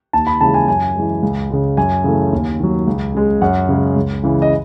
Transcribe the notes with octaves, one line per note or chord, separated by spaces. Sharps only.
D#2 A5
B5
C#3 E3 G#3 A5
G#5
F#2 G#5
E3 G#3
C#2
C#3 G#3
F#2 G#5
C#3 E3 A3
D#2
D#3 F#3
C#2
C#3 G#3
F#2 F#5
C#3 G#3
C#2
C#3 E3 G#3
D#5